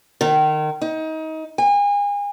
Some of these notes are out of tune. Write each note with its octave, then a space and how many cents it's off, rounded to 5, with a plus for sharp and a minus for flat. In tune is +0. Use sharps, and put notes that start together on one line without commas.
D#3 -25
D#4 +25
G#5 -35